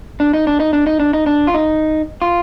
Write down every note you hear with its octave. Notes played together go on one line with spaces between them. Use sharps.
D4
D#4
D4
D#4
D4
D#4
D4
D#4
D4
F4
D#4
F4